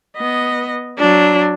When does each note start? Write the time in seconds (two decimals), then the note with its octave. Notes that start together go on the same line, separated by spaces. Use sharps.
0.17 B3 D#5
0.99 F#3 D4